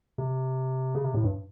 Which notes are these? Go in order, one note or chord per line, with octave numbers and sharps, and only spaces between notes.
C3
C#3
C3
A2
G2